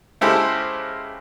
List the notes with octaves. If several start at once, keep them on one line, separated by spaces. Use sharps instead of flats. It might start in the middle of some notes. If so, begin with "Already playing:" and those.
C#3 G#3 E4 G4 A4 C5